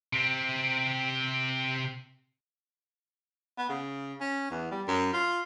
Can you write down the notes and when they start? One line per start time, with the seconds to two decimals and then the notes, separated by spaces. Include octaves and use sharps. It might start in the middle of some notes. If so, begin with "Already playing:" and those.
0.13 C3 C4
3.58 B3
3.69 C#3
4.21 C#4
4.51 E2
4.71 G3
4.88 F#2
5.13 F4